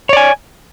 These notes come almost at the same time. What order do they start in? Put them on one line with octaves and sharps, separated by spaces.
C#5 D5 G#5